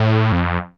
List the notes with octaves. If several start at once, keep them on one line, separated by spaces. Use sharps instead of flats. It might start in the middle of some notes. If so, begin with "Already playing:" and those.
Already playing: A2
F2